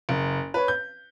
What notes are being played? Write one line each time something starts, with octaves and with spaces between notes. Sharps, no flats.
F#1
B4 C#5
G6